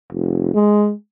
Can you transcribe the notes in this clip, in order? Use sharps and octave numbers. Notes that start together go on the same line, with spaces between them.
F1
G#3